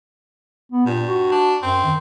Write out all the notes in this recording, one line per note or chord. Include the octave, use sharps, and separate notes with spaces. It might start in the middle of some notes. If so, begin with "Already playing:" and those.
B3
G2 A#2
F#4
D4
F#2 C4
D#3